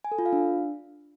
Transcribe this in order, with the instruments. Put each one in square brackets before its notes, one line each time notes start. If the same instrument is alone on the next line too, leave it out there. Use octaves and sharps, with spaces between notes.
[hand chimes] G#5
A4
F4
F5
D4